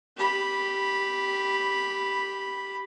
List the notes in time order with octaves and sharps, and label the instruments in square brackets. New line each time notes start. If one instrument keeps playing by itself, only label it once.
[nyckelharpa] G4 B5